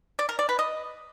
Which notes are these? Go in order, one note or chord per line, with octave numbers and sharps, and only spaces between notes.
D5
A#4
D5
B4
D#5